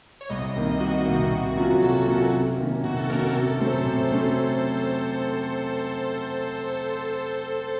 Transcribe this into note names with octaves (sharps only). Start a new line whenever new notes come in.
C#5
C2 D#5
C3 D#3 A#3
C2 F#4
C3 D#3 A#3
C3
F#3 A#3 C#4 F4
C3 A4
F#3 A#3 C#4 F4
C3
D#3 A#3 C#4
C3 F#4
A4
D#3 A#3 C#4 A#4
A4
C3 A4
F#3 A3 C#4 C5
C3 A4
F#3 A3 C#4